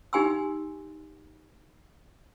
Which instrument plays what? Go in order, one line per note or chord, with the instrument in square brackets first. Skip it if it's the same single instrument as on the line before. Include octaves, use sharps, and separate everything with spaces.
[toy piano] D#4 G4 G#5 C6 E6